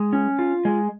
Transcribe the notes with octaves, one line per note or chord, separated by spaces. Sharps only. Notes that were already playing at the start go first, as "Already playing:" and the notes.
Already playing: G#3
C#4
F4
G#3